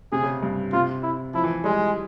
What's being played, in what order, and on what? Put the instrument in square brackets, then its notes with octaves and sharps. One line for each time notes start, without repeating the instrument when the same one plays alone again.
[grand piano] C3 [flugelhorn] G#4
[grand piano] C#3
G2
[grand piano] C3 [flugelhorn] F4
[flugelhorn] E4
[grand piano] F3 [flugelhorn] E4
[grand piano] E3
[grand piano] G3 [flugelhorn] G#3